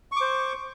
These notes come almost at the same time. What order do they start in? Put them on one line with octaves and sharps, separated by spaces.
C#6 D6 C5